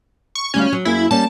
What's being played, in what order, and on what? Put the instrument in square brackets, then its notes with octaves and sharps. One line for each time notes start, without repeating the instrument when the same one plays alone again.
[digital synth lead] C#6
[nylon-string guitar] D2 G3 F5 [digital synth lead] C#4
[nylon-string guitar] F#3
[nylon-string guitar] F#2 A#3 G#4 [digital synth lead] E4
[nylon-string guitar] G3 A#3 C#4 [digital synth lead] A5